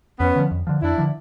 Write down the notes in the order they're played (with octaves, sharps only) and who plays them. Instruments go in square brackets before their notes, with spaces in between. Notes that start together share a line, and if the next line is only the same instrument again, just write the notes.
[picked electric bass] F2 [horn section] B3 C#4
[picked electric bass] D3 F3
F2
D3 F3
[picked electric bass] F2 [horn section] D4 E4
[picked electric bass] D3 F3